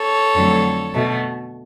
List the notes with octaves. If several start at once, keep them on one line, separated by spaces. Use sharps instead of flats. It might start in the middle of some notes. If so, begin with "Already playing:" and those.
Already playing: A4 C#5
F2 D3 F#3 A3
B2 A3